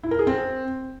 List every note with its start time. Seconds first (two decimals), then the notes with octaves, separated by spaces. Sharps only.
0.03 E4
0.11 A#4
0.19 G#4
0.27 C4